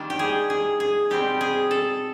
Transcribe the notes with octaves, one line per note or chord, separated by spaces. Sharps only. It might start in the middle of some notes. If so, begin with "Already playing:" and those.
Already playing: D#3 G3 A#3 D4
G4
G#4
G#4
G#4
B2 G3 C4 G4
G#4
A4